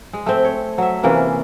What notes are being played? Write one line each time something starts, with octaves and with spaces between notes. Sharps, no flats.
G#3
A3 C4
C#5
F#3 E5
C3 E3 A#3 C#4